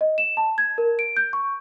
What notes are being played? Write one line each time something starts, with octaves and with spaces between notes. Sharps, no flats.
D#5
E7
A5
G#6
A#4
D7
G6
C#6